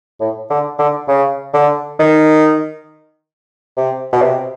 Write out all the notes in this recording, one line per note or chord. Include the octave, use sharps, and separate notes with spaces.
A2
D3
D3
C#3
D3
D#3
C3
B2
C3